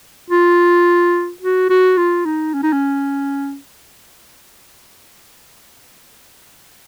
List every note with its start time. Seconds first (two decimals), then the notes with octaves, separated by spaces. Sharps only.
0.30 F4
1.42 F#4
1.70 F#4
1.98 F4
2.26 D#4
2.54 C#4
2.63 D#4
2.73 C#4